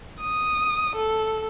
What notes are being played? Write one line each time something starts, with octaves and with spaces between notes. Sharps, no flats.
D#6
A4